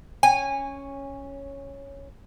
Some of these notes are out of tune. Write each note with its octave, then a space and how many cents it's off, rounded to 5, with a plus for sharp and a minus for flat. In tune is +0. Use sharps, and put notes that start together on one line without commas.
C#4 +0 G#5 -20